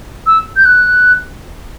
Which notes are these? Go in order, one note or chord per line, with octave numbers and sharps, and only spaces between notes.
E6
G6
F#6